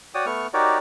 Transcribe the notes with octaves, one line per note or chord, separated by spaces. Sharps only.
F#4 C#5 D5 G5 D#6
A3 B3 C#6 F6
D#4 F#4 G4 A#4 C#5 D5